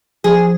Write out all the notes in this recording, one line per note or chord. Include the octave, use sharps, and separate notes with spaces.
F3 G#4